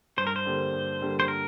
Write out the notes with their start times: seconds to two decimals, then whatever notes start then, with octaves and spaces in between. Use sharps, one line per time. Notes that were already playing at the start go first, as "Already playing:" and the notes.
0.17 G2 C5
0.27 A#4
0.36 C5
0.46 D3 G3 A#3
0.73 G2
1.01 D3 G3 A#3
1.20 C5
1.28 A#4